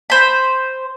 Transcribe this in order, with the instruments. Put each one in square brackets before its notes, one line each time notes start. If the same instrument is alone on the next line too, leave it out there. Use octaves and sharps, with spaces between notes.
[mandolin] C5 B5